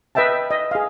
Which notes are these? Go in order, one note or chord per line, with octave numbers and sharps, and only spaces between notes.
B4 D#5 E5 G5 A5
D#5
G#4 F5